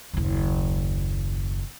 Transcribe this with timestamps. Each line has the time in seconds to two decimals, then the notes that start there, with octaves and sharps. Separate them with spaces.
0.13 F#1 D#2